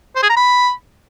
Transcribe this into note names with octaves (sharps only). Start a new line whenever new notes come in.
C5
G#4
A#5
B5